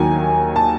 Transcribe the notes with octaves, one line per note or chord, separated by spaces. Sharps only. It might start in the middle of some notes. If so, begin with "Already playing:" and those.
Already playing: D#2 D#3 F#3 G#5
A5